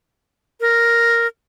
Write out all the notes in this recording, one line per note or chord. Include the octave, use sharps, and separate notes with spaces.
A#4